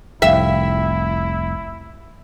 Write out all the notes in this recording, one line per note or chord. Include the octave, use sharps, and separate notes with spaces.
F1 C2 E4 E5 F5 G5